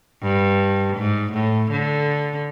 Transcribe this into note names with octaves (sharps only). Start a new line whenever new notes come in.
G2
G#2
A2
D3